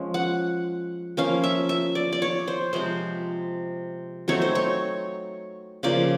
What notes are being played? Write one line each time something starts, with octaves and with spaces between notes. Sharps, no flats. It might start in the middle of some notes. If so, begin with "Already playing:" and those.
Already playing: F3 G#3 C#4
F#5
F3 A#3 C#4 F5
E5
E5
D5
D5
C#5
C5
C3 F3 G#3 C5
F#3 A3 C4 D#4 C#5
C5
C#5
C#3 F3 A#3 D5